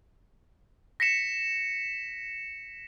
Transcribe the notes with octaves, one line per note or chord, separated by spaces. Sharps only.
A#6 B6 C#7 E7